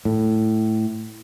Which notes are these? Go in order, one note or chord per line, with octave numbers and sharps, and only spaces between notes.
A2